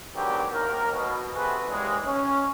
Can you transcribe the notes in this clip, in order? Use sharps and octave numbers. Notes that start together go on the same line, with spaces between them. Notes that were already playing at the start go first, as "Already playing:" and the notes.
G#2 B2 D#3 F#3 D4 G4
D#2 A#4
B2
C3 F#4 G#4 A4 B4
D#2 E3 G3 G#3
C#4